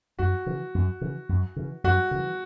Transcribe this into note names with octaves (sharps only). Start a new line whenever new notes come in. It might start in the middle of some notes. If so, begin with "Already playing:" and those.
F#2 F#4
C#3 E3
F#2
C#3 E3
F#2
C#3 E3
F#2 F#4
C#3 E3